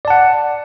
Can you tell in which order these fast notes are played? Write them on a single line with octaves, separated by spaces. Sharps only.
D5 A5 F#5